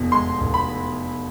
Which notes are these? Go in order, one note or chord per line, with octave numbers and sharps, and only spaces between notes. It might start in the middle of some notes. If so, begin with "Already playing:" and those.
Already playing: F1 E2 B2
G#3 C6
F1
B5